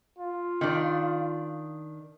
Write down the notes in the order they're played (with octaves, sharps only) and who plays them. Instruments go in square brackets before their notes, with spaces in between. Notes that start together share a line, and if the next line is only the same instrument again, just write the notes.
[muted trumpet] F4
[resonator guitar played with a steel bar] D#3 D4